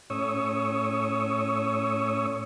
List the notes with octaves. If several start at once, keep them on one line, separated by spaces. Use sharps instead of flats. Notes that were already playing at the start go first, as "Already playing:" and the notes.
A2 C#4 C#5 C#6 D#6 E6